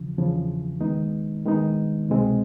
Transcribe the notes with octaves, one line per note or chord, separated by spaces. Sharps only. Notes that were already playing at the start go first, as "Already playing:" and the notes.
Already playing: E2 C#3 F3
E2 C#3 F3
D#2 D#3 G#3 B3 D#4
D#2 D#3 G#3 B3 D#4
C2 B2 G#3 C4